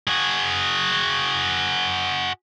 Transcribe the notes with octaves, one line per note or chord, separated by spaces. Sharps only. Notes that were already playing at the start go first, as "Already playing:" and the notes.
F#4 G#4